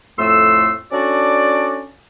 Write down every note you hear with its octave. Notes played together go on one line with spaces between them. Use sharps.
F2 A2 A3 C6 E6
C#4 D4 F#4 A4 D5